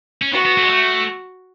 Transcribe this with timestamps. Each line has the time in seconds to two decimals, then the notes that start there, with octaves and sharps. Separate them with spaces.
0.22 C#4
0.33 B3 F#4
0.46 B3
0.58 A3
0.64 G#3
0.70 A3